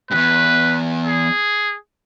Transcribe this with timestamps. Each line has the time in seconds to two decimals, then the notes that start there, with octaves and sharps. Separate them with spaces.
0.11 E2 G2 B4
1.06 G#4